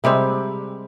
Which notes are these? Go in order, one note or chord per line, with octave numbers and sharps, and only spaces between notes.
C3 G3 G#3 C4